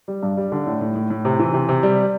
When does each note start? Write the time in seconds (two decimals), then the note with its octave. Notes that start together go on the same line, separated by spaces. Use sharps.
0.08 G3
0.23 G2
0.37 G3
0.52 D3
0.66 A2
0.81 A2
0.95 A2
1.10 A2
1.25 C3
1.39 E3
1.54 C3
1.69 C3
1.83 G3